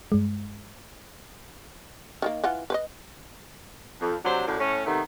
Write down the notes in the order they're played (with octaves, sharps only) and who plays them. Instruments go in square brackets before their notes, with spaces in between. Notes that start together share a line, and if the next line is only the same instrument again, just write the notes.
[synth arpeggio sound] G2 G#3
[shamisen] D#3 G#3 A#3
E3 F4 F#5
B4 C5 D#5
[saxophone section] F2
C3 F#3 D4 C5
F#2 A2 D3
A2 C#4
C3 D#3 A3 B3